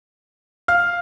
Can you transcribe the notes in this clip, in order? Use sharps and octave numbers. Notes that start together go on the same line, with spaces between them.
F5 F6